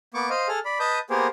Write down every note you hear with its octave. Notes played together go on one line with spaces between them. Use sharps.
A#3 B3 C#6 D6
C5 D#5 F5
G#4 A4 F6
D5 B5
B4 D#5 A5 D#6 G6
A#3 B3 G4 G#4 A#4 C5